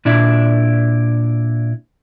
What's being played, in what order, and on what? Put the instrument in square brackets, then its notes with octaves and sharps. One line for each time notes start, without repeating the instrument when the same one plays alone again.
[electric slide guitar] A#2 D4 E4